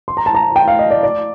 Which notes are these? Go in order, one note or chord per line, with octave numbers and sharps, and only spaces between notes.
C6
A#5
A5
A#5
G5
F5
D#5
D5
D5